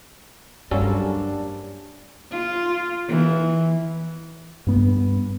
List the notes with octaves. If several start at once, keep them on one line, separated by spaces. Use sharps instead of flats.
G2 F#3 G3 A#3 C#4 D4 A4 C5
F4
E3
G2 B3